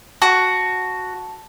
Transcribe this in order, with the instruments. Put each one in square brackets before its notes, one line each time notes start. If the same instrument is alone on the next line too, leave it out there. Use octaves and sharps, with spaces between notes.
[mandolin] F#4 [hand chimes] A5